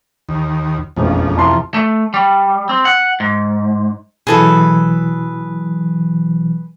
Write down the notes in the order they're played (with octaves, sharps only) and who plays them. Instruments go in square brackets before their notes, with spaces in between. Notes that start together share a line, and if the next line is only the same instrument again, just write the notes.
[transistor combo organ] D#2
[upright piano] E1 A1 F4 [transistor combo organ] F2
[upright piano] C2 A5 C6
[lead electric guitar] A3
G3
C4
F#5
G#2
[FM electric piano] B2 E3 F#3 [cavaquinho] G#4 A4 B4